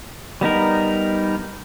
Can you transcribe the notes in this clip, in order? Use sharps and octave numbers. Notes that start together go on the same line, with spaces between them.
G3 B3 D#4 A#4